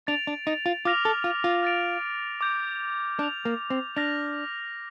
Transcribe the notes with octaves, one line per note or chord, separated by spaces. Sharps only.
D4 A6 D7 F7
D4
D#4
F4
F4 D6 F6 A#6 F7
A4
F4
F4
F6 A6 D7 F7
D6 G6 D7
D4 G6 D7 F7
A#3
C4
D4 F6 A#6 F7